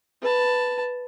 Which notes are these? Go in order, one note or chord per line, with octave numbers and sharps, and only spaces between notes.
B4 A5